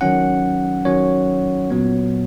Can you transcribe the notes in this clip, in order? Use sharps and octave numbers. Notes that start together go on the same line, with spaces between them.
D#3 F#3 C#4 F#5
D#3 F#3 C#4 C#5
A#2 F#3 B3